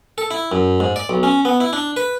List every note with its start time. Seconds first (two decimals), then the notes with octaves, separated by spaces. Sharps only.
0.18 A4
0.31 E4
0.52 F#2
0.80 G#2
0.96 D5
1.09 B1
1.23 C#4
1.45 B3
1.60 E4
1.73 D4
1.97 B4